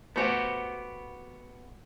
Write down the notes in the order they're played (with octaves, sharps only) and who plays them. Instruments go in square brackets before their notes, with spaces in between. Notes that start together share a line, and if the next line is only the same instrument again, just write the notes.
[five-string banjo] A3 C5 F#5 [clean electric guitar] B3 F#4 G4